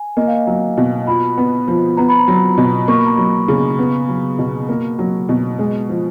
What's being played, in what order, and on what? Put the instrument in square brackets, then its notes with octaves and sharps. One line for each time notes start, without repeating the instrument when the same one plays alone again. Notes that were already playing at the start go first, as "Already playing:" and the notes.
Already playing: [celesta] G#5
[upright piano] A#3 [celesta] D#5
[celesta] F5
D#5
[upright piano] F#3
B2
[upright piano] F4 [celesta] B5
[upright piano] B3
F3
[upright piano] B3 [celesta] A#5
[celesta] B5
A#5
[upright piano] F#3
B2
[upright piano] A#3 [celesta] C#6
[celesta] B5
A#5
[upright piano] F#3 [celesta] B5
[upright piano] C#3
B3
F#3
B2
A#3
F#3
B2
G#3
F3